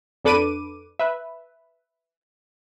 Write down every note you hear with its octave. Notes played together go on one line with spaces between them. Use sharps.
F2 D4 A4 B4 D6 D#7
B4 E5